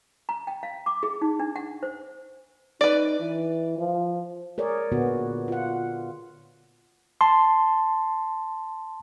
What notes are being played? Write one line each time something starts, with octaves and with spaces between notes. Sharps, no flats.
A#5
G5
F5
D6
G#4
D#4
D4
F#5
C5
D#4 B4 D5
E3
F3
G#4 A#4 C#5 D5
A#2 D3 B3 F#4
F4 F#5
A5 C6